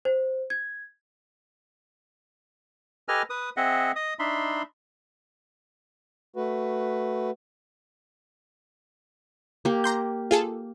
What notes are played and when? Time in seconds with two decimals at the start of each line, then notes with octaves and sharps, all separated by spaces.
0.05 C5
0.50 G#6
3.08 G4 A4 B4 D#5 G#5 F6
3.30 B4 D#6
3.57 C4 G#4 D#5 E5 F#5
3.96 D#5 D#6
4.19 D4 D#4 E5 B5 C6
6.36 A3 F#4 B4
9.65 A#3 G4
9.84 A#5 C6 G6
10.31 F4 G#4 A4